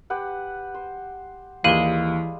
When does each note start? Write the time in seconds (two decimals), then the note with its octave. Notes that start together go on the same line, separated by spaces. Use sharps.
0.10 G4 B4 F#5
0.74 C5
1.64 D#2 E3 G3 G#3 F5 D#7 F#7 G7